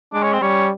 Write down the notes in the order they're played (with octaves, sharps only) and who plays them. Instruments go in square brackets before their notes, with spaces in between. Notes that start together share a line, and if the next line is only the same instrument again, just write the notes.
[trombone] G#3 [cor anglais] D4
[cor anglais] C#4
C4
[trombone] G3 [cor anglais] C#4